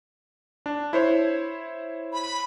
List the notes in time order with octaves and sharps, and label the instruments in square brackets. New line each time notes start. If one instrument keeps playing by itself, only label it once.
[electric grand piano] D4
E4 C5 C#5
[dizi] B5